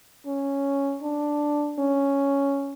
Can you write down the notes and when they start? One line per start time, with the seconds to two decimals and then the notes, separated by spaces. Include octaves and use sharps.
0.27 C#4
1.02 D4
1.79 C#4